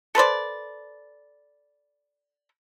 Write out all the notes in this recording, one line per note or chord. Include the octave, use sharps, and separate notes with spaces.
A4 B4 C5 D5